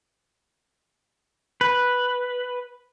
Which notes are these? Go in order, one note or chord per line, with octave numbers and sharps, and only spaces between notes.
B4